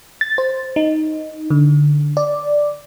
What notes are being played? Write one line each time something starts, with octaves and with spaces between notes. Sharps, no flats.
A6
C5
D#4
D3
D5